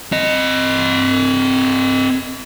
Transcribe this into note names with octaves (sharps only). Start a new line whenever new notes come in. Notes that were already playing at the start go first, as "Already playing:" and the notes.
C4 D#5